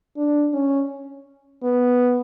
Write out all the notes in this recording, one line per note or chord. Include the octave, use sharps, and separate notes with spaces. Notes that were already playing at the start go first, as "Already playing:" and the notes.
D4
C#4
B3